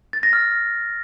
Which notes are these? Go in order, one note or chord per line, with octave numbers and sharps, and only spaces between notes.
A6
A#6
F6